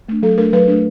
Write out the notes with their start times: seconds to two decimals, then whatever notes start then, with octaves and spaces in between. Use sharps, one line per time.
0.09 A3 D4
0.23 F#3 A4
0.38 A3 D4 A#4
0.53 F#3 B4
0.68 A3 D4